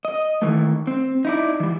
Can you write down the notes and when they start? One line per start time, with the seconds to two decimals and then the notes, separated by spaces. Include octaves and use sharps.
0.05 D#5
0.42 D#3 E3 A3
0.87 C4
1.25 D#4 E4 D5
1.60 E3 G3